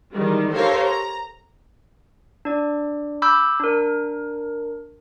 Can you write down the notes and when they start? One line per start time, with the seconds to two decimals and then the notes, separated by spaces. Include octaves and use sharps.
0.13 D#3 E3 G3 G#3
0.52 G4 A4 A#4 C5 C#5 F5
0.86 A#5
2.45 D4 D5
3.22 B5 D6 E6 G6
3.60 D4 A#4